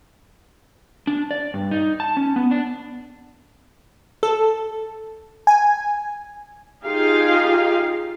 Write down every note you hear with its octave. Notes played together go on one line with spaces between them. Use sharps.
D4
D5
G2
D#4
A5
C#4
B3
D4
A4
G#5
D#4 F4 G4 G#4 F5